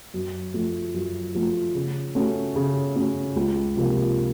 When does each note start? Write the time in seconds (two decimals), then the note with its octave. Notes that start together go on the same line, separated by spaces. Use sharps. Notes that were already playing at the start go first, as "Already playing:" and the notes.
0.14 F#2
0.54 F3 A3
0.94 F#2
1.35 F3 A3
1.75 C#3
2.15 A3 C#4 F#4
2.56 C#3
2.96 A3 C#4 F#4
3.36 C#2
3.76 C3 F3 A#3